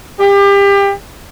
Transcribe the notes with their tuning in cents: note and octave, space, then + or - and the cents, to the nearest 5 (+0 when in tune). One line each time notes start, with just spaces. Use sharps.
G4 +30